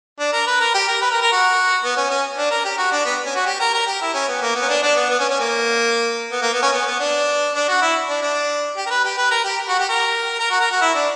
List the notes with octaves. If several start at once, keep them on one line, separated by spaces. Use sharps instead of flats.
D4
A#4
B4
A#4
G4
A#4
B4
A#4
A#4
F#4
B3
C#4
C#4
D4
A#4
G4
F#4
D4
B3
C#4
F#4
G4
A#4
A#4
G4
E4
C#4
B3
A#3
B3
C#4
D4
D4
B3
B3
C#4
C#4
A#3
B3
A#3
B3
C#4
B3
B3
D4
D4
F#4
E4
D4
D4
G4
A#4
B4
G4
B4
A#4
G4
F#4
G4
A#4
A#4
F#4
A#4
F#4
E4
D4